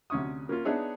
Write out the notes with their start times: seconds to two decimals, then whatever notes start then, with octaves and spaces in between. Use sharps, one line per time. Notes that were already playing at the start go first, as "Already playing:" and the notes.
0.10 D2 C3 C#4 C#6 D#6
0.49 A#3 C#4 F4
0.65 B3 D4 D#4 G#4 C#5 E5